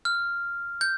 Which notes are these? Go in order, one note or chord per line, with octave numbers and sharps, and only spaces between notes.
F6
G6